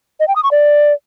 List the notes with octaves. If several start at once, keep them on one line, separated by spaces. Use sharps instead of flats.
D#5
G5
D#6
C#6
D5